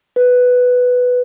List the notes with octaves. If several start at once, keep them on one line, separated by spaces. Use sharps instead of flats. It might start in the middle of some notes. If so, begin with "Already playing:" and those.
B4